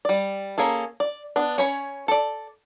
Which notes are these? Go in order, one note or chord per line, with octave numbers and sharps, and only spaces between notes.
G3 D5
A#3 C#4 G#4 A4
D5
B3 D4
C#4 C#5 B5
A4 D5